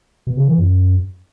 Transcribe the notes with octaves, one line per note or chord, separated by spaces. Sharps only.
B2
C#3
E3
F#2